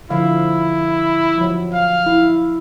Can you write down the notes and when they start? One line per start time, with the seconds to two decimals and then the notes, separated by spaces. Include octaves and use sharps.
0.11 D3 F3 E4 F5
1.38 F3 F#3
1.73 F5
2.06 E4